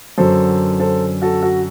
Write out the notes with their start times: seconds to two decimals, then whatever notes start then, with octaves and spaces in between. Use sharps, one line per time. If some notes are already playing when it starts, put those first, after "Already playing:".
0.18 F#2 D3 F#3 A4 C5
0.80 A4 C5
1.22 F#4 A4
1.43 F#4